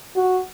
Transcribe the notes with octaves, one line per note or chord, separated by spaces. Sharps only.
F#4